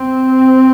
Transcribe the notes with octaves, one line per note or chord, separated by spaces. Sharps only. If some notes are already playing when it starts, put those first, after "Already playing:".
Already playing: C4